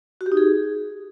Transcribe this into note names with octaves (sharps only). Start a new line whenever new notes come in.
F#4
G4
D#4
G#4